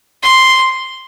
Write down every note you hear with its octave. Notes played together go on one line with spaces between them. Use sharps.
C6